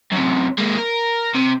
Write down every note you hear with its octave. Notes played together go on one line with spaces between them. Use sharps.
F#2 C3
G#3 A#3
A#4
C3